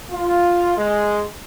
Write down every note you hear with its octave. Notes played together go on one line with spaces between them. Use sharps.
F4
G#3